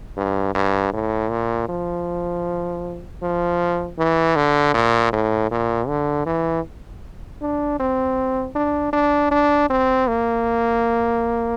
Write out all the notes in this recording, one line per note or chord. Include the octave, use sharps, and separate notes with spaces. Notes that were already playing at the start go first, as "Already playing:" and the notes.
G2
G2
A2
A#2
F3
F3
E3
D3
A#2
A2
A#2
D3
E3
D4
C4
D4
D4
D4
C4
A#3